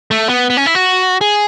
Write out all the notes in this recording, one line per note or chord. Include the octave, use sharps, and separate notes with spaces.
A3
B3
B3
C#4
E4
F#4
G#4